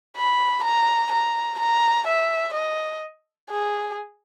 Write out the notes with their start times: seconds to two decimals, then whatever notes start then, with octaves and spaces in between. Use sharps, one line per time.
0.17 B5
0.64 A#5
1.12 A#5
1.60 A#5
2.07 E5
2.54 D#5
3.51 G#4